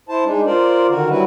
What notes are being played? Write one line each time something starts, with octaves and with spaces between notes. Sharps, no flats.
E4 C5 A5
G#3 D4 D#4
F4 A#4 C5 D5
D3 D#3 F#4 A#4
F#3 G3 E4 F#4 B4